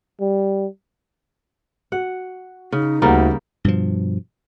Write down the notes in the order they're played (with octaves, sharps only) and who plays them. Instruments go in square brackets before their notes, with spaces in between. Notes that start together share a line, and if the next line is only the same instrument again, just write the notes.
[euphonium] G3
[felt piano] F#4 [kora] F#5
[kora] C#3 [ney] D#4
[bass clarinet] D2 [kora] C#3 G3 A#3 [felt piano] F#5 A#5
[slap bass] G2 B2 F3